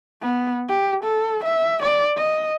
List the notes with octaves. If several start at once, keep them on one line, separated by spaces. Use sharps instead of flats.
B3
G4
A4
E5
D5
D#5